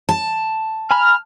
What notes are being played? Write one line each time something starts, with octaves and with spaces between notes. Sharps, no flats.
A5
G#5 A#5 B5 F6